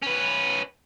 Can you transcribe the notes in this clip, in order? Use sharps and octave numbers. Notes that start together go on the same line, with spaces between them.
C#4 B4